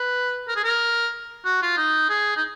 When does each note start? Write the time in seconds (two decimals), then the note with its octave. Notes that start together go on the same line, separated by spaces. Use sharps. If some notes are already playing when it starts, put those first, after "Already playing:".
Already playing: B4
0.48 A#4
0.56 G#4
0.64 A#4
1.45 F#4
1.62 F4
1.78 D#4
2.10 G#4
2.37 D#4